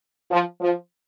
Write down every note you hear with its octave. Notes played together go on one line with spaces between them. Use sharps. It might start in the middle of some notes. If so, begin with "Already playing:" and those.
F3
F3